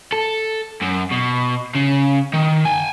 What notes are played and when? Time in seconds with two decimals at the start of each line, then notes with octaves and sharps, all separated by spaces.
0.12 A4
0.82 F#2
1.11 B2
1.75 C#3
2.34 D#3
2.65 G5 G#5